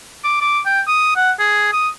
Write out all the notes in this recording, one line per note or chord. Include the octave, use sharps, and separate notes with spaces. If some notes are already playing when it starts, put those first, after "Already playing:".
D6
D6
G5
D#6
F#5
G#4
D#6